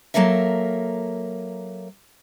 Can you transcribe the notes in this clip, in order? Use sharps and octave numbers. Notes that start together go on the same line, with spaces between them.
F#3 A#3 A4 A#4 E5